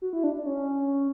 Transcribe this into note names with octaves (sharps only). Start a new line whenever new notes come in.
F#4
E4
D4
D4
C#4